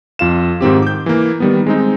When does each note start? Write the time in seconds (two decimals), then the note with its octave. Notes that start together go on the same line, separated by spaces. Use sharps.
0.19 F2 F4 F5 E7
0.61 G#2 D#3 C4 G4
0.82 D6 G6
1.06 E3 A#3
1.40 D#3 G3 B3
1.66 G#3 C4 D#4